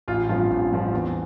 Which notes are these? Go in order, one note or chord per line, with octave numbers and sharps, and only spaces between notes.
A1 F4
G2 F3 C4 F4
A1
G2 F3 C4
E2